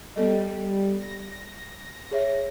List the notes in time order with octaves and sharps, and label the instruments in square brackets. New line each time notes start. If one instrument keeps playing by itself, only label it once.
[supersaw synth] G3 [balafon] B3 A4 D#5
[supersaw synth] A#6
[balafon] G#4 C#5 E5